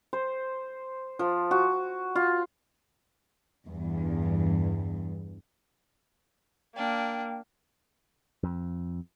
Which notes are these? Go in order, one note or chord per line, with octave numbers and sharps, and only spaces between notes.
C5
F3
F#4
F4
E2 G2
A#3 D4 G5
F2